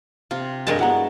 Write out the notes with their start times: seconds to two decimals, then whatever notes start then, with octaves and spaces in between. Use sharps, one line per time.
0.31 C3 F4
0.67 G2 G#3 G4 A#4 B4 C#5 D#5 A5
0.79 F#3 B3 E4 F#5 A#5